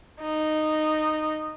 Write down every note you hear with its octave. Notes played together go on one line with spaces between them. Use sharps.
D#4